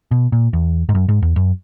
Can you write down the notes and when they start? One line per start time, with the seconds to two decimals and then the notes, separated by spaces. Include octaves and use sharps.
0.11 B2
0.32 A#2
0.53 E2
0.89 G#2
0.95 F#2
1.08 G#2
1.22 E2
1.36 F#2